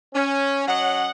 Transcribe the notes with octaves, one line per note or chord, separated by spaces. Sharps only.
C#4
F#3 C#4 D#5 F#5